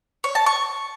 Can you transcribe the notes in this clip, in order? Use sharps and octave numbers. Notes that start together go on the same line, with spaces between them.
C#5
A5
C#6